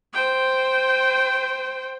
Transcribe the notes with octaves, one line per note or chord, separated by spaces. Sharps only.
C5 G5